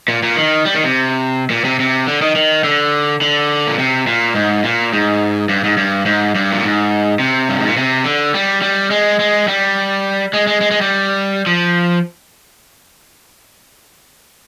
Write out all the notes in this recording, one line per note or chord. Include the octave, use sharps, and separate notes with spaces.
A#2
A#2
D#3
G3
D#3
C3
A#2
C3
C3
D3
D#3
D#3
D3
D3
A#2
C3
A#2
G#2
A#2
G#2
G2
G#2
G2
G#2
G2
A#2
G#2
C3
G2
G#2
A#2
C3
D3
G3
G3
G#3
G#3
G3
G#3
G#3
G#3
G#3
G3
F3